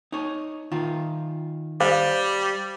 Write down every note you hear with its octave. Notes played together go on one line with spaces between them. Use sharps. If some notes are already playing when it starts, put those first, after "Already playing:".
D#4 C#5
D#3 F4
G3 C5 F5